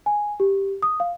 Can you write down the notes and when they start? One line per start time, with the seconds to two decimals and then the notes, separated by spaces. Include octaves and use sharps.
0.06 G#5
0.40 G4
0.82 D#6
1.00 F5